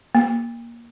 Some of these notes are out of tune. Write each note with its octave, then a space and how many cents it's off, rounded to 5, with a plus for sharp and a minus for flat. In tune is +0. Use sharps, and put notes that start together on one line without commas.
A#3 +10